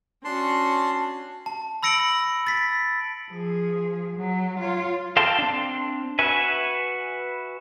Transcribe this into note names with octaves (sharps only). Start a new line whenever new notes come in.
C#4 D4 F#4 A5 C6
A5
B5 E6 A#6 C#7 D7 F#7
A6 B6
F3 G#4
F#3
F4 C#5
A4 F5 G5 A5 C6
C4 D4
F#4 B4 E5 G#5